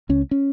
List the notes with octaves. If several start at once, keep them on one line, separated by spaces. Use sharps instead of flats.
C#2 C#4
C#4